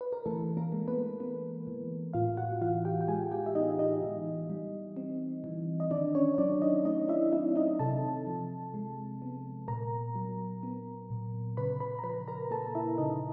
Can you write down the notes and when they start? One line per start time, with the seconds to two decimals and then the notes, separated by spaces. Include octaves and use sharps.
0.01 B4
0.13 A#4
0.26 E3 A3 A4
0.57 A#3 A#4
0.72 G#3
0.88 B3 B4
1.20 B3
1.67 E3
2.13 A2 F4 F5
2.37 F#4 F#5
2.61 E3 F4 F5
2.85 G4 G5
3.01 G5
3.08 G#3 G#4 G#5
3.31 G4 G5
3.46 E5
3.55 B3 D#4 D#5
3.79 D#4 D#5
4.03 E3
4.50 G3
4.97 C4
5.44 E3
5.80 D#5
5.91 D#3 D4 D5
6.15 C#4 C#5
6.34 C#5
6.38 F#3 D4 D5
6.62 D#4 D#5
6.85 A3 D#4 D#5
7.09 E4 E5
7.32 C4 E4 E5
7.56 D#4 D#5
7.79 C3 A4 A5
8.27 F3
8.74 G#3
9.22 B3
9.68 A#2 A#4 A#5
10.16 F#3
10.63 B3
11.10 A#2
11.57 C#3 B4 B5
11.80 B4 B5
11.99 A#5
12.04 F3 B4 B5
12.28 A#4 A#5
12.51 A#3 A4 A5
12.75 E4 E5
12.98 C#3 D#4 D#5